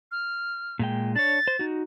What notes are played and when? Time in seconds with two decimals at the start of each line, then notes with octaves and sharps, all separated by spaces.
0.12 F6
0.79 A#2 G#3 G5
1.16 D4 C#5 A6
1.47 C5
1.59 D#4 F#4